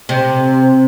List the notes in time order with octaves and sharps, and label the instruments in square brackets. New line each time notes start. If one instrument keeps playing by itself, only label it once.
[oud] C3